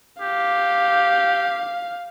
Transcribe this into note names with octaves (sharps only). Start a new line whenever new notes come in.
G4 F5